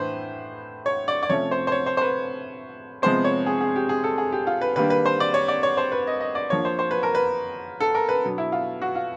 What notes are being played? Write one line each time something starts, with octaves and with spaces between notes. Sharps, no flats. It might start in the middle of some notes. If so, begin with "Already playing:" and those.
Already playing: A2 E3 D4 B4 C5
C#5
D5
D5
C3 F3 A3 C#4 C#5
C5
C5
C#5
C5
C5
B4
C3 F3 G#3 B3 C5
C#5
G#4
G#4
G4
G#4
A4
G#4
G4
F4
B4
D#3 G3 A#3 D4 B4
B4
C5
D5
C#5
D5
C#5
C5
B4
D#5
D#5
D5
F3 A#3 D4 C#5
C5
C5
B4
A#4
B4
A4
A#4
B4
B2 F#3 B3 D4
E4
F4
F#4
F4